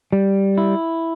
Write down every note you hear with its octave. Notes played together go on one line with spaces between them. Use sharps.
G3
E4